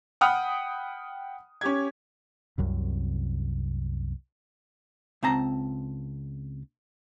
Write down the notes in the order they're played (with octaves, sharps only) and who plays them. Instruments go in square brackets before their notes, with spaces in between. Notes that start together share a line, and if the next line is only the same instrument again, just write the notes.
[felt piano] F#5 G5 B5 D#6 F6
C#4 G4 G#6
[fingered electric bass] C2 F#2 C3
[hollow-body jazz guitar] C#2 C4 A5 A#5